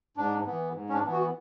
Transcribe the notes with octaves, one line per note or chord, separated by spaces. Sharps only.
G#2 D4
E3 B3
G#2
C#4
D4
E3 B3
F#4